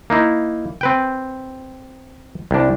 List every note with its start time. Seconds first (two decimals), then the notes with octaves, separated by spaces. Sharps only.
0.10 A#3 D#4 E4
0.81 C4 B4 G5
2.51 C2 D4